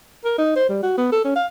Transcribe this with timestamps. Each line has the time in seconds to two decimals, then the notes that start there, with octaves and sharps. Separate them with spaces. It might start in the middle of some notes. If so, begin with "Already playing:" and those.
0.24 A#4
0.38 D#4
0.56 C5
0.69 G3
0.83 F#4
0.98 B3
1.12 A4
1.24 C#4
1.36 F5